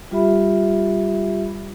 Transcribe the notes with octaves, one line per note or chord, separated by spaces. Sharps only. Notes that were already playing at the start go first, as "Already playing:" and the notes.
G3 F4 G4 E5 B5